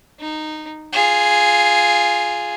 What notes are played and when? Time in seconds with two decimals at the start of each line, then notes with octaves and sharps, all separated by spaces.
0.20 D#4
0.93 F4 G#4